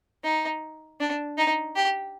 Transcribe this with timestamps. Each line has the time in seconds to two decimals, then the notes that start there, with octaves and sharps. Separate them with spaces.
0.24 D#4
1.00 D4
1.38 D#4
1.75 G4